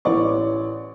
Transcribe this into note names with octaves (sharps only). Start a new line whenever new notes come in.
A1 E3 C#5 D5 C#6